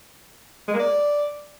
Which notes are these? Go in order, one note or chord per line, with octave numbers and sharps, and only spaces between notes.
G#3
A#3
D5